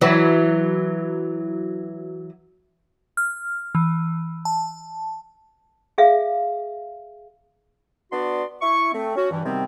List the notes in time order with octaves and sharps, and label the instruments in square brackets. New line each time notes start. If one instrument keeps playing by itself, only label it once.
[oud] E3 F#3
[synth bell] F6
E3
A5
[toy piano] G#4 E5 F5
[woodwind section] B3 D4 F#4 D5 C6
E4 C#6
A3 C4
C#4 F#4
G2 E3
C3 D#3 G3 B3 C4